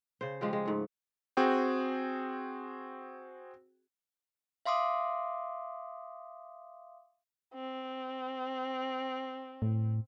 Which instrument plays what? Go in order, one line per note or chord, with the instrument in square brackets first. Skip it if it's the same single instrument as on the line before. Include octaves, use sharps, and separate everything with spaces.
[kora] C#3 C5
F3 G#3 F4 G4
G#3
G#2 A3
[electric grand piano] C4 F#4 G#4 G5
[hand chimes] E5 F5 C6 D6 D#6
[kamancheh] C4
[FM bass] A2